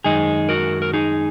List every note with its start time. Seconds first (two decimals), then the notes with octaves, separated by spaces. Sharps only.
0.04 F#2 D#3 G#3 D#4 G#4
0.49 F#4 A#4
0.82 A#4
0.94 D#4 G#4